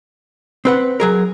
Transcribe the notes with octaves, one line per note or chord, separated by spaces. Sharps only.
C4 B4 F#5
F#3 G#4 A#4